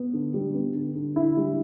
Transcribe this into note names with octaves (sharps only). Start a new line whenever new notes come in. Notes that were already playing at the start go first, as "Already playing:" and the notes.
Already playing: B3
D3
G3
B3
D3
D3
D3 E4
G3